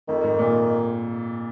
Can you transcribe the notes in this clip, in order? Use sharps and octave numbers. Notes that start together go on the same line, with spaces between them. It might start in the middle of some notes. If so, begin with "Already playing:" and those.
F2 D#3
G#2
A#2